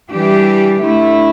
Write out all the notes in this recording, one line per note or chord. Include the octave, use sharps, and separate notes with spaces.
E3 G3 D4 G4
D3 A3 E4